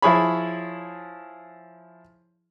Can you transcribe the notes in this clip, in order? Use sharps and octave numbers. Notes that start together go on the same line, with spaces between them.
F3 E4 G#4 C#5 B5